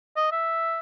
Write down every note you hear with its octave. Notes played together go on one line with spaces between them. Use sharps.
D#5
E5